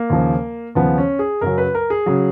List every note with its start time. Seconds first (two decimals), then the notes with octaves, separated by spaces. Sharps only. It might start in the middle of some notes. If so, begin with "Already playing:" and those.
Already playing: A#3
0.10 D#2 C#3 F3
0.75 D#2 C#3 F3 B3
0.98 C#4
1.19 G#4
1.41 F#2 C#3 F#3 A#4
1.58 B4
1.75 A#4
1.90 G#4
2.06 C#3 F#3